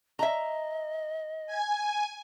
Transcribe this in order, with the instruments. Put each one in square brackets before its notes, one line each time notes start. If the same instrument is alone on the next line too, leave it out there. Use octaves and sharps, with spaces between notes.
[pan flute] D#5 [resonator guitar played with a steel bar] E5 A#5
[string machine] G#5